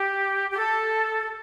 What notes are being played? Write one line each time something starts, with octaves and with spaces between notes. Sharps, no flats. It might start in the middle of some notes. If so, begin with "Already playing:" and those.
Already playing: G4
G4
A4